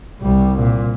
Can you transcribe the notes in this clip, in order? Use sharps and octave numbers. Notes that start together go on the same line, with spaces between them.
C2 G3
A#2